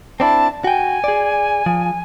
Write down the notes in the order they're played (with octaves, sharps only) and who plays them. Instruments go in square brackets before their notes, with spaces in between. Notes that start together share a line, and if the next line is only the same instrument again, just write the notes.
[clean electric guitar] C4 D4 E4 [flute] A5
[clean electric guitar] F#4 G5 [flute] G#5
[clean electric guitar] G#4 D5
F3